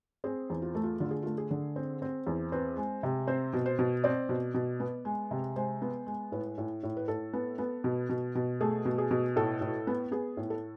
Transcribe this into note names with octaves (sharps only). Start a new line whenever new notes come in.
C4 G#4
E2
F4
A3
F4
D3 F4
G#4
A3 F4
G#4
D3
C4
C4
E2
C4 B4
G#3
C3
C4 C5
B2
C5
B2
C4 D5
B2
B2
B3
G#3
C3
G#3 C5
B3
G#3
A2 B4
A2
A2
B4
A2 A4
B3
B3
B2
B2
B2
A3 G#4
B2
G#4
B2
A2 A4
A2
B3
B3 G#4
A2
A4